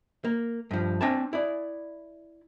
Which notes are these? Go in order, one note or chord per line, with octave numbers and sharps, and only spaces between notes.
A#3
G2 F3
C4 D4 G#5 A5
E4 D5